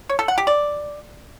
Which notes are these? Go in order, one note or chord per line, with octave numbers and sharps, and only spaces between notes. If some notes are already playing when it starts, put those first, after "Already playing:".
C#5
A4
F#5
G4
D5